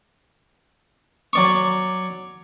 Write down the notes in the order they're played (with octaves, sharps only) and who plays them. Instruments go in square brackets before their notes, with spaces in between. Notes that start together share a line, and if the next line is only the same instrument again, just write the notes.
[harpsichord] F#3 D5 C#6